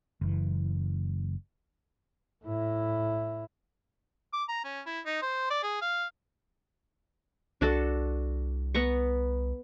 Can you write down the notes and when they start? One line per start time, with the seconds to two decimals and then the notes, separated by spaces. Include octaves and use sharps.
0.21 F#1 E3
2.45 A2 E4
4.33 D6
4.49 A#5
4.64 C#4
4.86 E4
5.06 D#4
5.22 C5
5.50 D5
5.63 G#4
5.82 F5
7.61 C2 D4 F#4 A4
8.74 B3 A#5 C#6